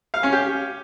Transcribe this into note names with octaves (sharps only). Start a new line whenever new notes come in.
F5
C#4
G4